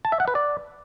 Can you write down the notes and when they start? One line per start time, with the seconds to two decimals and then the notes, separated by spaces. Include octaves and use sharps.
0.05 A5
0.12 E5
0.20 F#5
0.28 B4
0.35 D5